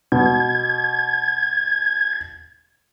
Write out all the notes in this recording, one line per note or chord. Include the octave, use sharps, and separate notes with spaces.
B2 G#6